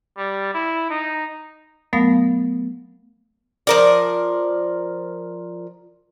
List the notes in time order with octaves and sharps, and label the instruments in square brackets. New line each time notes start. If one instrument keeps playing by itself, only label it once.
[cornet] G3
E4
D#4
[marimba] F#3 A3 B3 A#4 F5 D#6
[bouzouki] F3 A#4 D5